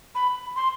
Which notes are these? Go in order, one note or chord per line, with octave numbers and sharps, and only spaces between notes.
B5
C6